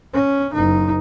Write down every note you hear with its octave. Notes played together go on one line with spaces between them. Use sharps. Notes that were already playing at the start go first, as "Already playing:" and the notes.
C#4
F#1 D#4